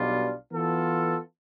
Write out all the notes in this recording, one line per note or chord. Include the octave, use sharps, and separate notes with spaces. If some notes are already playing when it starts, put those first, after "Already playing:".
Already playing: B1 B2 G3 D4 F4
E3 B3 F4 A4